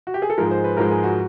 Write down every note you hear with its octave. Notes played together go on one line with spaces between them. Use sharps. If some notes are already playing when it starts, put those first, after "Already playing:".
F#4
G4
G#4
A4
G#2 F3 G#3 A#4
C5
B4
G#2 F3 G#3 A#4
G#4
F#4